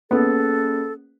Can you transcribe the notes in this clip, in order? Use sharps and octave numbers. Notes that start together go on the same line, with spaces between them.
A#3 B3 C#4 G#4 A4